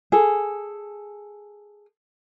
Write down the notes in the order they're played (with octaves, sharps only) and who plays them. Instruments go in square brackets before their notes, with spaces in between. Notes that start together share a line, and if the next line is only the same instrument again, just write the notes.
[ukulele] G#4 A4